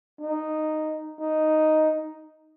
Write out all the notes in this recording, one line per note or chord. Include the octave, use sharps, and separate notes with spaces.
D#4
D#4